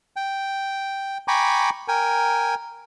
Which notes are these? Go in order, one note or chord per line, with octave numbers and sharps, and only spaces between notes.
G5
G5 G#5 A#5 B5 C#6 D6
A#4 G5 G#5